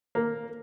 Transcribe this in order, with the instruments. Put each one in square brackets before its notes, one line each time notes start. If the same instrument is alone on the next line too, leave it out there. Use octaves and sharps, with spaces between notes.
[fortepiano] A#3